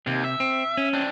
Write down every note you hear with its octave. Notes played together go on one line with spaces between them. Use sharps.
D#2 C3
E5
C4
C#4
C4 D4